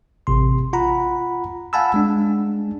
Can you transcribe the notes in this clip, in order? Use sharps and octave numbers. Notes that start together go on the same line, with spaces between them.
A1 C3 C6
F4 F#5 A#5 B5
F5 F#5 G#5 A5 B5 E6
G#3 D4